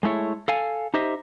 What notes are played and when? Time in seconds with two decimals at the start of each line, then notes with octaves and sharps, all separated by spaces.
0.03 G#3 A3 E4 C#5
0.48 A4 F5 G#5
0.94 D#4 G4 C5 D#5 E5